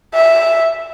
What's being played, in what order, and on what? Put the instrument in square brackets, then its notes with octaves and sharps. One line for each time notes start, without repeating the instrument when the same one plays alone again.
[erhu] E5